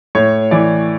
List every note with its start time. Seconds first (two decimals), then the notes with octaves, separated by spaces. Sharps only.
0.15 A2 C#5
0.51 E3 D5